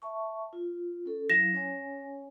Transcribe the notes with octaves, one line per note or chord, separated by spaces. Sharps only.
E5 A5 C#6
F4
C#4 A4
F#3 E4 F5 A#6 E7
C#4 C#5 G#5